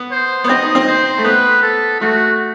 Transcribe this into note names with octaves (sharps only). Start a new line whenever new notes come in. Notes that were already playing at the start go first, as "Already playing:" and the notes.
Already playing: B3
C5
B3
C4 D#5
D#4
C4
C5
A3
B3 B4
A4
A3 F#4